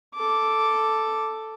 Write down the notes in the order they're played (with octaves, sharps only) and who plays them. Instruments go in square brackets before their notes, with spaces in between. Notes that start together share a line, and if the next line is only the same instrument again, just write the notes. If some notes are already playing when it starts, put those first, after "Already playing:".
[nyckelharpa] A4 D6